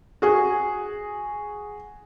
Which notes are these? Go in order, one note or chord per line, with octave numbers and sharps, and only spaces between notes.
F#4 G#4